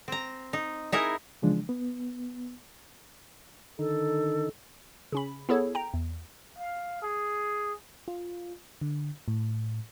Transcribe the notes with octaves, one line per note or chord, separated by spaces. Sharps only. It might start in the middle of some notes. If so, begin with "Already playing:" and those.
C4 A#5
D#4
D#4 E4 G#4 A#4
C#3 E3 F3 G#3 D4
B3
D3 D#3 D#4 A4
C#3 C#4 B5
B3 E4 G#4 A4 C#5
G5 A#5
E2
F5
G#4
F4
D3
A2